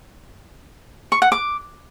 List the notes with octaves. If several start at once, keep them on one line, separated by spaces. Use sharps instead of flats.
C#6
F#5
D6